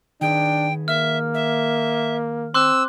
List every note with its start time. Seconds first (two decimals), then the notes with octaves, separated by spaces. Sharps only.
0.21 D#3 D4 G#4 B4 G5
0.88 A#3 E5 F6
1.34 E5
2.54 C4 C6 D6 E6 F#6